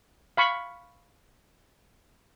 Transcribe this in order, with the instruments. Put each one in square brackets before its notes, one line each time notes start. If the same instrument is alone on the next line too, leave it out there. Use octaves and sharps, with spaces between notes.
[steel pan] F5 B5 C#6